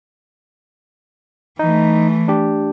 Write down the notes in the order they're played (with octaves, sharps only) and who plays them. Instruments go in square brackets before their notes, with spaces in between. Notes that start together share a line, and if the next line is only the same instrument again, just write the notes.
[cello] E3 A3 [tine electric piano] D#4
[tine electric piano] D4 G4